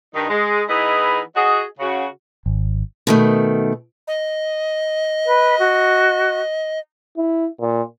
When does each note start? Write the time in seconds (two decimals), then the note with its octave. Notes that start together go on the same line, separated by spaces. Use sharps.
0.14 G2 D#3 D#4
0.30 G#3
0.69 E3 B3 D#4 E4 G#4 D#5
1.36 F#4 G#4 D#5
1.80 C#3 F#4
2.46 G#1
3.07 B2 D#3 A3
4.08 D#5
5.26 B4
5.59 F#4
7.17 E4
7.61 A#2